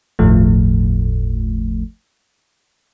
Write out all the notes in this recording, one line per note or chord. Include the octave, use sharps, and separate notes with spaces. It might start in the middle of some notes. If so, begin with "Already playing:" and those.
G1 D#2 A2 F3 A3